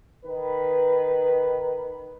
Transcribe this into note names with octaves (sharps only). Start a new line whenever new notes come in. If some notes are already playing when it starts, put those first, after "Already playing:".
D#3 B4